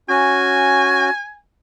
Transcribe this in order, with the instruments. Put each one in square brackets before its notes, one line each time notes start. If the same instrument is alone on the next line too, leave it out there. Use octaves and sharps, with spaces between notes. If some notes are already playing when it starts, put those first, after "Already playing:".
[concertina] C#4 F#4 [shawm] G#5